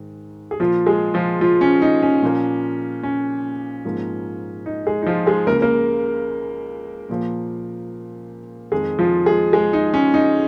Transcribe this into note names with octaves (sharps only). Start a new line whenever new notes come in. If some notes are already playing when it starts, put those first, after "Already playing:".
Already playing: G#2 D#3
G#4
A#2 F3 A#3 F4
G#3 G#4
F3 F4
F3 F4
C#4
D#4
C#4
A#2 F3 A#3
C#4
G#2 F3 A#3
D#4
G#3 G#4
D#4
F3 F4
G#3 G#4
C#2 C#3 A#3 A#4
A#3 A#4
A#2 F3 A#3
F2 D#3 G#3 G#4
F3 F4
G#3 G#4
G#3 G#4
D#4
C#4
D#4